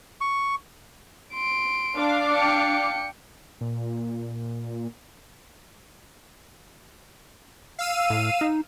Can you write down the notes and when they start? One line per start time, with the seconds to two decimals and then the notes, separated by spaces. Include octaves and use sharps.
0.21 C#6
1.34 C6 D7
1.96 D4 F5 D6
2.34 G5 C#7
3.61 A#2
7.79 F5 E6 D#7
8.10 A2
8.41 D#4